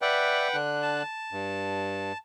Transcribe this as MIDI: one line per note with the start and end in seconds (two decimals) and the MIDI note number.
0.02 0.56 71
0.02 0.48 74
0.02 0.48 76
0.02 0.56 78
0.02 0.56 79
0.54 1.03 50
0.54 1.03 62
0.54 1.03 90
0.82 2.18 81
1.32 2.12 43